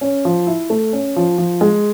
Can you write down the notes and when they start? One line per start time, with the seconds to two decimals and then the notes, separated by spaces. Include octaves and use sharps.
0.01 C#4
0.25 F3
0.47 E4
0.70 A3
0.93 C#4
1.16 F3
1.38 F3
1.61 G#3